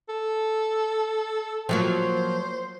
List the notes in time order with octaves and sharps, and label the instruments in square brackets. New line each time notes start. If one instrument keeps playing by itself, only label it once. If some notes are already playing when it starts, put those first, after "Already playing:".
[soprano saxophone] A4
[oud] F3 F#3 A#3 [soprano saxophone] C5